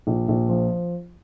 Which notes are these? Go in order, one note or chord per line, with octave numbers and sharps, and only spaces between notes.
A#1
A#1
F3